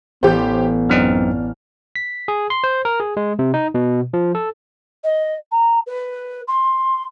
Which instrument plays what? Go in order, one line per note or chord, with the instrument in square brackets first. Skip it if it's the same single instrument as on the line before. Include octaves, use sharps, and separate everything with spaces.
[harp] A1 G6 [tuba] B3 [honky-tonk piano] G4 C5
[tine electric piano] F#2 C4 D#4 [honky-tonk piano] D4 F6
[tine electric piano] B6
G#4
C6
C5
A#4
G#4
G#3
C3
D#4
B2
F3
A4
[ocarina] D#5
A#5
B4
C6